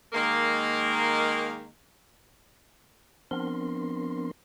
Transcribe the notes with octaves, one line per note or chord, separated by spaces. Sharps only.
D#3 G#3 A#3
F3 B3 C4 D4 A#4 C6